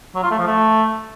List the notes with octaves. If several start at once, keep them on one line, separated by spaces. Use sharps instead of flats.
F#3
F4
A3
F3
A3